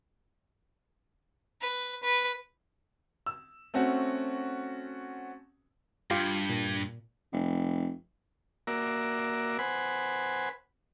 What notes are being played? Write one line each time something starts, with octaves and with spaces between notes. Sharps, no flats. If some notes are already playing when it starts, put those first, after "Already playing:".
B4
B4
E6
A3 C4 C#4 F#4
G2 F4 G4
A#2
F1
A#3 F#4 A#4 D5 E5
B4 C5 F#5 G#5 B5